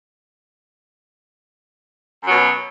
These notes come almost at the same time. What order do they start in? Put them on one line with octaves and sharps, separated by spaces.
F#2 F#3 B2